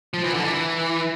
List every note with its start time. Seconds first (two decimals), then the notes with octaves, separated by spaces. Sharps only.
0.14 F3
0.24 E3
0.34 D3
0.44 E3